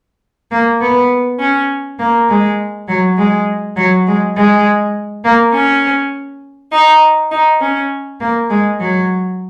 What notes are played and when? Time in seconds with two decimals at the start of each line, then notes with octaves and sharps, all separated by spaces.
0.50 A#3
0.80 B3
1.40 C#4
1.98 A#3
2.28 G#3
2.87 F#3
3.17 G#3
3.76 F#3
4.06 G#3
4.35 G#3
5.24 A#3
5.53 C#4
6.72 D#4
7.31 D#4
7.61 C#4
8.20 A#3
8.49 G#3
8.79 F#3